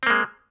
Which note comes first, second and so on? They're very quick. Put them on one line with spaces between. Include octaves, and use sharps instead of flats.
C4 A#3 G#3